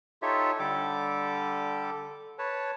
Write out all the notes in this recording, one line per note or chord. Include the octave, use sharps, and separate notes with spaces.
D#4 F4 G4 A4 C#5 E5
D3 G3 G4 A4 D6
B4 C#5 A5